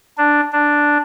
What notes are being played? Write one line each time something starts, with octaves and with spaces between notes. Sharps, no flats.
D4
D4